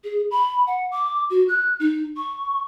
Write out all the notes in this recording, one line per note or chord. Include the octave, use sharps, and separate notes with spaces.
G#4
B5
F#5
D6
F#4
F#6
D#4
C#6